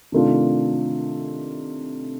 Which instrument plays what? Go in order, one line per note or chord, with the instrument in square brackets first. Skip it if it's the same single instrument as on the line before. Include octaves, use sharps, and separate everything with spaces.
[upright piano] C3 D#3 A3 D4 F4